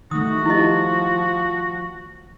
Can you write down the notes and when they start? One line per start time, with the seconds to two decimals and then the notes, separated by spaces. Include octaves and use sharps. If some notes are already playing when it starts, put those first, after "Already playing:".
0.11 D#3 G3 A3 D#4 F#4 D#6
0.46 F3 E4 G4 D#5